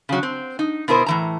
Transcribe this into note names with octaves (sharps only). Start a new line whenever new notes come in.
C#3 F#3
C4
D#4
B2 B3 E4 A#4 C5
A2 E3 A#5